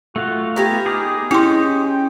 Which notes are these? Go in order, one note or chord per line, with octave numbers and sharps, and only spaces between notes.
A3 F4 F#4 F5
B3 G4 G#5 A#5
D#4 G#4 D6 F6
C#4 E4 G4 G#4 D#5 C6
G5